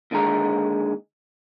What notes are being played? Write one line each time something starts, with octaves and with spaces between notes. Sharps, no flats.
D#2 D3 D#3 G#3 A#5